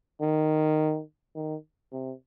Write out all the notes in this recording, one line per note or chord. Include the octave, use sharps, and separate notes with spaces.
D#3
D#3
C3